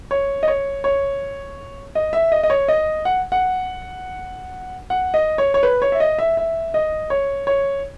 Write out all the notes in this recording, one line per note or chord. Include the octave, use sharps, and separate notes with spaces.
C#5
D#5
C#5
C#5
D#5
E5
D#5
D#5
C#5
D#5
F#5
F#5
F#5
D#5
C#5
C#5
B4
C#5
E5
D#5
E5
E5
D#5
C#5
C#5